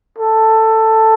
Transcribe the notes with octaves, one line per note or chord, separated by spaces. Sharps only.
A4